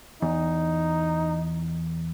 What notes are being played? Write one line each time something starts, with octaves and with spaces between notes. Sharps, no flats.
E2 D#4